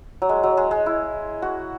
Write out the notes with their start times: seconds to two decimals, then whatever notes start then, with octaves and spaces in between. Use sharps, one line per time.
0.22 F#3
0.29 G#3
0.43 F#3
0.57 G#3
0.71 G#3
0.86 E4
1.42 F#4